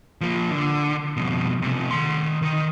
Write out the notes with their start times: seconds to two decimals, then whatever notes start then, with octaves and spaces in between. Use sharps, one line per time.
0.21 F3 A#3
0.51 D3
1.17 F2 B2
1.62 C3 A3
1.91 D#3 C6
2.42 D#3